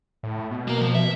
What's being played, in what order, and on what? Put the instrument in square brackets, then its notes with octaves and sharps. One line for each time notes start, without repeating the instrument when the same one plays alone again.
[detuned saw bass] A2
B2
[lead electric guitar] A#3 A#4
F3
E5